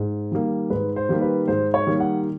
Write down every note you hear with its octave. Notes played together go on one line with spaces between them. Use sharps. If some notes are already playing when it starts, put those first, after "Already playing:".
Already playing: G#2
D#3 G3 A#3
G#2 B4
C5
D#3 G3 A#3
B4
G#2 C5
C#5
D#3 G3 A#3
F#5